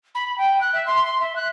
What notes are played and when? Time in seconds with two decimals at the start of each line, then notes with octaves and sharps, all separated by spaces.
0.15 B5
0.38 G5
0.61 F#6
0.73 E5
0.87 C6
1.04 C6
1.20 E5
1.36 F#6